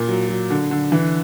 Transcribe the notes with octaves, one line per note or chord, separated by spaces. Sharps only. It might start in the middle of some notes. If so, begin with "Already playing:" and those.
Already playing: A#2
F#3
F#3
D3
D3
E3